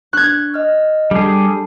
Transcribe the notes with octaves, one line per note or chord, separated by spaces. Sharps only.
D4 C#6 F#6 G#6
D#5 F6
G3 D4 G#4 A4 A5